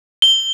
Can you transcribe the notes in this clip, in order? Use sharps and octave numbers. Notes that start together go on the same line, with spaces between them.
G7